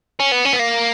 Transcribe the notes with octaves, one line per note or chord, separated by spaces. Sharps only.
C#4
B3
C#4
B3
A#3